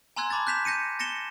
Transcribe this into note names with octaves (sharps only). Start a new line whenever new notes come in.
G#5 A#5 C6 E6 F#6 G#6
A5 B5 D6 G#6 A6
F#6 G6 B6 E7 F7
G6 A#6 C#7 D#7
A6 A#6 C#7 E7 G7